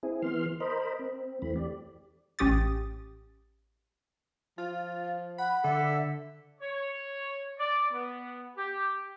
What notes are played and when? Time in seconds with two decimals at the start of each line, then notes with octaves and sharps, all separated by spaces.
0.03 C4 E4 G#4
0.22 E3 B3 C6 F6
0.60 A#4 C5 D#5 B5
0.99 C4
1.42 E2 E3 A3 C4 B5
1.56 G4 D5
2.39 A1 C#4 G4 D#6 A6
4.58 F3 F4
5.38 F#5 B5
5.64 D3 A4 E5
6.61 C#5
7.58 D5
7.92 B3
8.56 G4